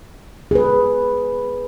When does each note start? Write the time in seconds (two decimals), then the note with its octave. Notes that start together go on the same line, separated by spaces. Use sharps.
0.51 G#4 B4